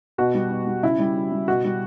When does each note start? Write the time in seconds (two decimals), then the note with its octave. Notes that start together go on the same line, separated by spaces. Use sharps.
0.18 B2 F#4
0.35 G3
0.51 B2
0.67 G3
0.83 C#3 E4
0.99 G3
1.16 C#3
1.32 G3
1.48 B2 F#4
1.64 G3